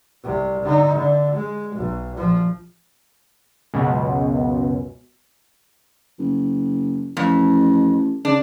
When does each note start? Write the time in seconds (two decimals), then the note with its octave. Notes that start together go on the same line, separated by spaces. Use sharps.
0.23 C2 C3
0.63 D3 D#4
0.95 D3
1.35 G#3
1.76 B1
2.17 A#1 F3
3.74 C#2 F#2 B2
6.19 F#1
7.17 A1 F2
8.25 C#3 D4